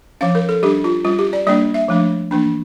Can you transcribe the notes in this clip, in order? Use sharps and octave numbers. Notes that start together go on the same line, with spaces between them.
F3 C#4 F5
A#4
A4
G3 D4 G4
F4
G3 C#4 F4
G4
D5
G3 A#3 D4 D5
E5
F3 A3 D4
E3 A#3 D4